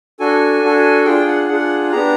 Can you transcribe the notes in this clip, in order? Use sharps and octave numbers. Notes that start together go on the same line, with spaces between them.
D4 F#4 A4 G#5
D4 F#4 A4
D4 F4 G#4 G5
F#5
D4 F4 G#4 F#5
B3 D4 G4 A#5